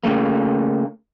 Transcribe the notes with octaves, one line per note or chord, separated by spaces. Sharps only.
C#3 A3 A#3